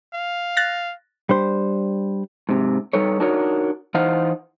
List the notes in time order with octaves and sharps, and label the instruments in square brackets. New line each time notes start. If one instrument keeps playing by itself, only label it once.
[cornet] F5
[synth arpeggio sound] F#6 A6 A#6
[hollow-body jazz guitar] G3 D4 C5
[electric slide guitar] G#2 C3
G3 D#4 A4 B4 C#5
D4 D#4 F#4 A#4 C#5
E3 D#4 C5 F5 F#5